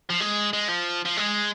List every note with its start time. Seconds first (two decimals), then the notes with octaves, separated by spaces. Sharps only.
0.10 F3
0.21 G#3
0.53 G#3
0.69 F3
1.05 F3
1.17 G#3